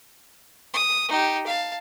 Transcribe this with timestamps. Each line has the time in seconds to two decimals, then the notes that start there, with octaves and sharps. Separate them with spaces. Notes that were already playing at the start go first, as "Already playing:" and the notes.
0.73 D#6
1.08 D#4 G4
1.46 F5 A5